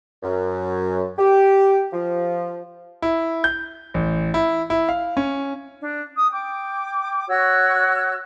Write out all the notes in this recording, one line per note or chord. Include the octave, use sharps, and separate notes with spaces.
F#2
G4
F3
E4
G6
A1
E4
E4
F5
C#4
D4
D#6
G5 D6
F#4 C#5 E6 F#6